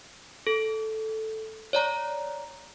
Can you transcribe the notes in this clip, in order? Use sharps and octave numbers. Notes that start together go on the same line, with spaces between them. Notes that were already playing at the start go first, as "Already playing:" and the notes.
A4
C#5 D5 A#5